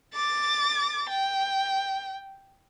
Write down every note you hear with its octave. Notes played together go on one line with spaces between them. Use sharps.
D6 A6
G5